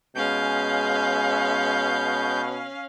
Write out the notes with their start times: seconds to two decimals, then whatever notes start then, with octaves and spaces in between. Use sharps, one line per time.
0.15 B2 G#3 C#4 F5 G6